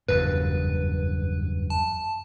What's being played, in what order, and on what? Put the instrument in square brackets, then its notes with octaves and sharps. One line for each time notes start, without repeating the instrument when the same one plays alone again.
[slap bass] F#1 E2 G2 [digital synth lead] B4
[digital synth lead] A5